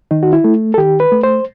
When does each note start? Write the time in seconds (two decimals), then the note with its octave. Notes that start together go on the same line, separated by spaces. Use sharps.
0.11 D#3 D#4
0.23 F#4
0.33 E4
0.44 A3
0.74 A4
0.77 D#3 G4
1.00 B4
1.12 A3
1.23 C5